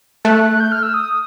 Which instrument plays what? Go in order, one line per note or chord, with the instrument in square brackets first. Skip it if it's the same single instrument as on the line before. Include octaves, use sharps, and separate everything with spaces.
[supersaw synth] A3 [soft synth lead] F#6
[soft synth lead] F#6
G6
F6
E6
D#6